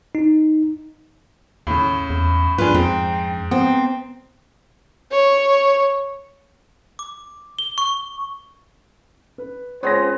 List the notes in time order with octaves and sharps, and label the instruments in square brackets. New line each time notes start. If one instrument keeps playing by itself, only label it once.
[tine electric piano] D#4
[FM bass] D#2 [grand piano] A2 C#3
[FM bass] E2
[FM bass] G2 [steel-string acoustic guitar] D4 F4 [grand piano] G#4 B4
[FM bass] F2 [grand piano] G#2 [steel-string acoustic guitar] C4
[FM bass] B3 [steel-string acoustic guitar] C4
[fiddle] C#5
[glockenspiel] D6
G7
C#6
[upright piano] B4
[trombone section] C#2 C5 [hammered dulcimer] B3 C4 G#4 [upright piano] C#5 A#6